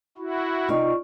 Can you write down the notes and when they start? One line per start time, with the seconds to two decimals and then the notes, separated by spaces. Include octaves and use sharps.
0.18 E4 F#4
0.69 C3 D#4 F4 D5 C#6